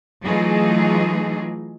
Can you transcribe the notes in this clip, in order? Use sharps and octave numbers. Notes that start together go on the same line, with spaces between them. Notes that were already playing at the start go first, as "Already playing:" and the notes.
E3 F#3 A3 D#4 F4 G#4